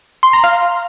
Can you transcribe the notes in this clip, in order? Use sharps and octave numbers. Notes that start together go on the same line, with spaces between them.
C6
A#5
F5